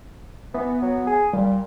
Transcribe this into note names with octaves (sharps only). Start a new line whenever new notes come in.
E3 B3
F#3
G#4
A#2 G3